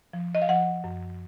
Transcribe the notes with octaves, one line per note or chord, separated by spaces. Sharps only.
F3
D#5
F5
F3 F#5
F#2